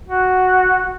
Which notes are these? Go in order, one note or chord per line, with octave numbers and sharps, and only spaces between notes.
F#4